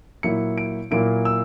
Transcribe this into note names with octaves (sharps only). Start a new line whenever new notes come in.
A#2 F#3 A#3 E4 C#7
D7
A#2 F#3 A#3 E4 D7
E6